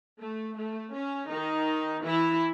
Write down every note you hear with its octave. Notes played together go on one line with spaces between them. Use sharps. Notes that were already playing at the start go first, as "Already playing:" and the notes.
A3
A3
C#4
D#3 D#4
E3 E4